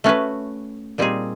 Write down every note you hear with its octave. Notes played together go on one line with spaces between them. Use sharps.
A3 C#4 F#4 B4
A#2 G3 C4 D#4 G#4